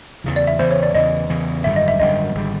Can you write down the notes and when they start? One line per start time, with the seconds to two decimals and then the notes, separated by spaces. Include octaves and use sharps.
0.24 E2 C#3 E3
0.36 D5
0.47 E5
0.59 E2 C#3 E3 C5
0.71 C#5
0.83 D5
0.94 E2 C#3 E3 D#5
1.29 E2 C#3 E3
1.64 G#1 F#2 D3 G3 E5
1.76 D#5
1.88 E5
2.00 G#1 F#2 D3 G3 D#5
2.35 G#1 D3 G3